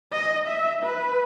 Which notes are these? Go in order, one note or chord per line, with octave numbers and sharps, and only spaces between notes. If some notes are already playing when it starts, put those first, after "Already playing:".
D#5
E5
B4